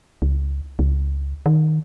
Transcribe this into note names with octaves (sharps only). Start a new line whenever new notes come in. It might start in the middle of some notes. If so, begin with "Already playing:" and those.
C#2
C#2
D#3